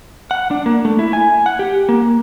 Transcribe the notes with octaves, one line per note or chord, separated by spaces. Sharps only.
F#5
D4
A#3
A3
E4
G#5
F#5
G4
A#3